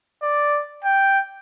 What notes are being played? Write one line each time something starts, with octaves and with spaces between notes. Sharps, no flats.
D5
G5